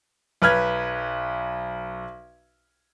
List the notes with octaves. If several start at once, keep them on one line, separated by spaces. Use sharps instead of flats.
B1 B4 F6 G#6